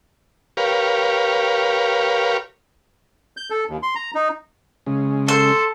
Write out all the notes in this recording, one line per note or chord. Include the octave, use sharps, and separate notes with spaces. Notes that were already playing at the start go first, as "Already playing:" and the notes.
G4 A#4 B4 C#5 F5
G6
A4
D#2
C6
A#5
D#4
C#3 G#3
A4 C5